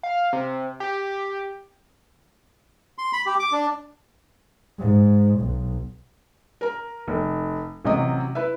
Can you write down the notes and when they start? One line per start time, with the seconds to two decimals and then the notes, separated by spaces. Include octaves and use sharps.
0.03 F5
0.33 C3
0.80 G4
2.98 C6
3.13 B5
3.26 G4
3.39 D6
3.52 D4
4.79 G#2
5.40 B1
6.61 A#4 A#5
7.08 F1
7.85 A1 C3 F#3 D#5 D#6
8.35 E4 B4 E5